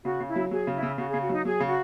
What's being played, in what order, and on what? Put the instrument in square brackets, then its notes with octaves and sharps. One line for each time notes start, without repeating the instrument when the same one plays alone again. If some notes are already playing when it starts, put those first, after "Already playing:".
[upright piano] C#3 [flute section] F#4
[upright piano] C#3
[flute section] E4
[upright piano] F#3
[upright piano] F#3 [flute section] G#4
[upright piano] C#3
[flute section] E4
[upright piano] C#3
[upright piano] C#3 [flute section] F#4
[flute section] G#4
[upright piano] C#3
[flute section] F#4
[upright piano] F#3 [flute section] D#4
[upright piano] F#3 [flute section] G#4
[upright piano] C#3
[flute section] F#4